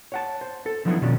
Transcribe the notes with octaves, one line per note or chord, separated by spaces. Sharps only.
C#5 F#5 A5
C5
A4
D3 F3 F#3 B3 D#4 E4
B2 D#3 F3 C#4 D4